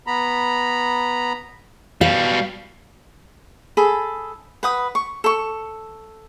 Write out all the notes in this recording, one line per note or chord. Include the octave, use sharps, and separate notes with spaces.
B3 A#5 B5
B2 G3 F5
G#4 A4 B5
B4 F#5 D#6
C#6
A4 C#6